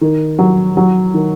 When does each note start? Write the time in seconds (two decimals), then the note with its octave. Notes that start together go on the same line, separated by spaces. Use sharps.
0.01 D#3
0.39 F#3
0.77 F#3
1.14 D#3